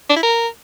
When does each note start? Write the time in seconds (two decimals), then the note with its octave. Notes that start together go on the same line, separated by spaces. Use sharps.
0.10 D4
0.16 E4
0.23 A#4